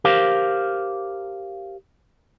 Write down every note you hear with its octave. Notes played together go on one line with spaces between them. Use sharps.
G4 A#4 C5 F5